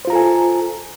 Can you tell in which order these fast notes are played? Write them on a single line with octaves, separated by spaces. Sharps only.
C5 F4 A#5 A4 G#5